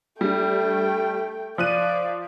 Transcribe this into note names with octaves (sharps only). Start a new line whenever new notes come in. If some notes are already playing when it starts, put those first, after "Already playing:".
G3 A3 D4 G5
F3 D5 F5 F#6 D#7